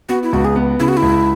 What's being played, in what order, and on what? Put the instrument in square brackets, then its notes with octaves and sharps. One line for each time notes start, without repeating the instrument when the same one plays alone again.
[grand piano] B3 [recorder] F#4
[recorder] E4
[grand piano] C#2 [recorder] F#4
[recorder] G#4
[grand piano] B3
[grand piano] C#3 [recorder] E4
[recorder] F#4
E4
[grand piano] C#2